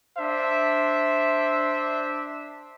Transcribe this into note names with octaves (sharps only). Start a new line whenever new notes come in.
D4 C5 E5